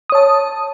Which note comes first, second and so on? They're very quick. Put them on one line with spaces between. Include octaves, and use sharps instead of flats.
D#6 C#5 A5